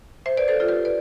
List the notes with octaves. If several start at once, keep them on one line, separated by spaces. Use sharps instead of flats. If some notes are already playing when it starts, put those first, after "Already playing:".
C5 E5
B4 D5
A4 C5
F4 A4
G4 B4
B4 D5